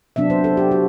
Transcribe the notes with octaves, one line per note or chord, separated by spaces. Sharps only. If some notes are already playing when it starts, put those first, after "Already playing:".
C3 F#3 B3 D4 E5
C5
A4
G4
F#4